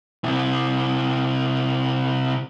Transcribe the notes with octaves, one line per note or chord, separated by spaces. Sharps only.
C3 E4